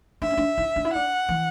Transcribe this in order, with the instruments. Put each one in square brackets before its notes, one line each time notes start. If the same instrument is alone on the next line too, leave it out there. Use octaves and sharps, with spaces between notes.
[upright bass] D4 [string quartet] E5
[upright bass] C#4
D4
E4
D4
E4
[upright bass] D4 [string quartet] F#5
[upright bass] E3